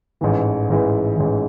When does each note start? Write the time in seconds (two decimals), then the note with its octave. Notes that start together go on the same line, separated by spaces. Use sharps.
0.21 A1 G#2 E3
0.69 A1 G#2 E3
1.16 A1 G#2 E3